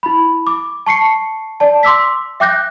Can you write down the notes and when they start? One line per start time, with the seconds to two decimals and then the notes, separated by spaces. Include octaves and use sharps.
0.03 E4 B5
0.47 D6
0.86 A5 C#6 C7 C#7
1.60 D5 A5
1.83 C6 D6 E6 B6
2.40 E5 G5 D6 F#6 G6 A#6